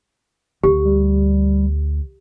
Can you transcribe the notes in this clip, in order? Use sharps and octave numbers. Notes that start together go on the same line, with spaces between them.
D2 G4
G3